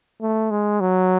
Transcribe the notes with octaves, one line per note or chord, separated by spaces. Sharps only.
A3
G#3
F#3